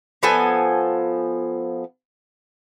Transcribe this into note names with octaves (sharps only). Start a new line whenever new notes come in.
F3 B3 A4 G#5